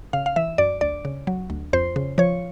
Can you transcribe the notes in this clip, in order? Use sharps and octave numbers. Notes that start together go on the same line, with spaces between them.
C#3 F5
F5
E3 E5
F#2 D5
D2 D5
C#3
F#3
D2
F2 C5
C#3
F3 C#5